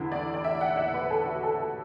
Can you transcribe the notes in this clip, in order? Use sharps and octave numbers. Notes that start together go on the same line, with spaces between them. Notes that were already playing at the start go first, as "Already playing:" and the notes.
Already playing: E2 D3 B3 E4
D5
D5
E5
F#5
E5
B4
A4
F#4
A4
A4